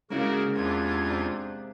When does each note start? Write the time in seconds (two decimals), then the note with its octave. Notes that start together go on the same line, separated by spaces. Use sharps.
0.10 G#2 C#3 G#3 A#3 C#4 E4 F#4 A#4
0.56 E2 C3 D4 F4 G#6
1.04 C3 D4